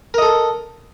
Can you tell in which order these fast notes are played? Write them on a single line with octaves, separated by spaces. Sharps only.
A#4 D#5 A4